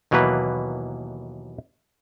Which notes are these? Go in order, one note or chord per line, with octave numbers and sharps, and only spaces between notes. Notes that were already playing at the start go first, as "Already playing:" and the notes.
D#2 B2 E3 F#3 A#3 B4